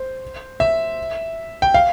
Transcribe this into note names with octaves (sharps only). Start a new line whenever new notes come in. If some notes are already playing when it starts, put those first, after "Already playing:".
Already playing: C5
E5
G5
F5